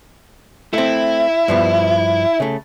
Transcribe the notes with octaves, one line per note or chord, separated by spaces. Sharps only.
A3 C4 E4
G2 F3 B3
C#3 A3